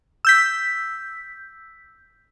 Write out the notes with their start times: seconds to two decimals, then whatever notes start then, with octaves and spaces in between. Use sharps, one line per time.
0.25 E6 G6 B6